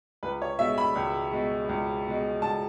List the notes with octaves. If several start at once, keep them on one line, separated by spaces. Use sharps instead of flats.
C#2 B4
C#5
B2 G#3 E5
B5
C#2
B2 G#3
C#2
B2 G#3
C#2 A5